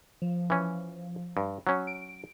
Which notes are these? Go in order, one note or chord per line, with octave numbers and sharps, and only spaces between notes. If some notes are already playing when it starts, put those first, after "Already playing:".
F3
E3 C#4
G2
F#3 C#4
D7